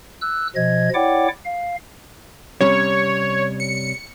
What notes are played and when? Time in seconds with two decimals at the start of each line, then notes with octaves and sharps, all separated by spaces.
0.21 E6 F#6
0.56 B2 F3 D#5 G#6
0.94 E4 C#5 D5 F#5 G5 D6
1.45 F5
2.61 C3 G3 C#4 C#5
3.60 C#7